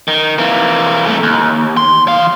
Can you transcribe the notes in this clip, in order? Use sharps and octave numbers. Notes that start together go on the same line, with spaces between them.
D#3
E3 A#3
C2 A3
D#2
C6
E3 F5